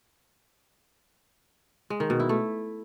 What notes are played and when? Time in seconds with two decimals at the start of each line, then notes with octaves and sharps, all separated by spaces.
1.90 G#3
2.00 D#3
2.10 B2
2.20 E4
2.29 A3